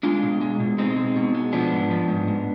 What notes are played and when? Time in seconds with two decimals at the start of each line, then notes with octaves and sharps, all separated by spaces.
0.03 G#3 D4 F4
0.23 B2
0.41 G#3
0.60 B2
0.78 G#3 C4 D#4
0.97 G#3
1.16 B2
1.35 G#3
1.53 F3 B3 D4
1.72 G#2
1.91 F3
2.09 G#2
2.28 G#2